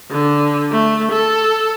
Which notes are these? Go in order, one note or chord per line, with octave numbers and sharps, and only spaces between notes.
D3
A3
A4